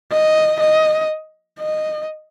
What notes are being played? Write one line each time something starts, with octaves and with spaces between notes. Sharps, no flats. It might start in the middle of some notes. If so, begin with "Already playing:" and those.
D#5
D#5
D#5